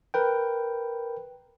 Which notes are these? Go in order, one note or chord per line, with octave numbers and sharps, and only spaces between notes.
A#4 B4 G5